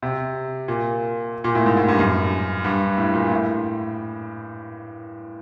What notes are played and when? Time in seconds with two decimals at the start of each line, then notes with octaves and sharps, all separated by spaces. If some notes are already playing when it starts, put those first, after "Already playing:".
0.02 C3
0.68 A#2
1.44 A#2
1.55 A2
1.66 G#2
1.77 A2
1.88 G2
1.99 F#2
2.64 G2
2.98 A2
3.14 A#2
3.31 A2